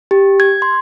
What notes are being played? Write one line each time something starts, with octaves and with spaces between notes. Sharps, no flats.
G4
G#6
C6